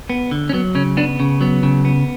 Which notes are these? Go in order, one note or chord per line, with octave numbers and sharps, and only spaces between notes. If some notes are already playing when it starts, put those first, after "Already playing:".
B3
D3
C#4
F#3 B3
C#3 C#4
B3 D4
C#3
F#3 B3
C#3
B3